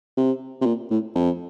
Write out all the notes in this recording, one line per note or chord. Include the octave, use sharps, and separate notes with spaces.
C3
C3
A#2
A2
F2